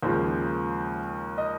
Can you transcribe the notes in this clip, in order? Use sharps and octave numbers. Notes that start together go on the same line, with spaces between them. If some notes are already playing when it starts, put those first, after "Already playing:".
D#2 C#3 F3 G#3 C5
D#5